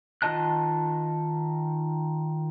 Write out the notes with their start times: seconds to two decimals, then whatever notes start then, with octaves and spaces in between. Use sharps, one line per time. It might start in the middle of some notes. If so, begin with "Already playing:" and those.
0.22 D#3 F4 D#5 A5 F#6